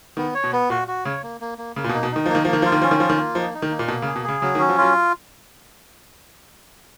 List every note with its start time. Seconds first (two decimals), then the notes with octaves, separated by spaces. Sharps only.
0.17 D#3 B3
0.34 C#5
0.44 B2
0.53 B3
0.70 A#2 F#4
0.88 F#4
1.05 C#3 C#5
1.23 A#3
1.41 A#3
1.58 A#3
1.76 C#3 A#3
1.84 A#2
1.89 B2
1.94 D#4
2.03 B2
2.12 D#3 D#4
2.26 F3 A#3
2.35 D#3
2.45 F3 A#3
2.53 D#3
2.62 F3 F4
2.72 D#3
2.82 F3 C#4
2.91 D#3
3.00 F3 F4
3.10 D#3
3.17 A#3
3.35 F3 D#4
3.54 D#4
3.62 D#3
3.71 A#3
3.79 A#2
3.88 B2 A#3
4.02 C#3
4.06 G#4
4.16 B2
4.24 C#3 G#4
4.42 C#3 F#3
4.55 D#3
4.59 C#4
4.69 F3
4.78 F#3 F4